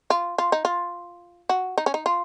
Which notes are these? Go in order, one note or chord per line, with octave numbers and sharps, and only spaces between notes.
F4
F4
D#4
F4
F#4
D#4
C#4
D#4
F4